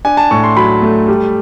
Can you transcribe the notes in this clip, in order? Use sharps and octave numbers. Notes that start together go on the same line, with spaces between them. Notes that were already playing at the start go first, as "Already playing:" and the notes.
D4 G#5
A5
A2 C#6
C6
F#3 B5
A3
G3